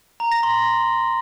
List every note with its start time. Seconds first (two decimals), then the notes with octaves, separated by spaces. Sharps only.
0.20 A#5
0.32 A#6
0.43 C6